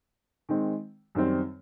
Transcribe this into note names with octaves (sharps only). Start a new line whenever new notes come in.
D#3 G#3 C4
F#2 D#3 G3 C4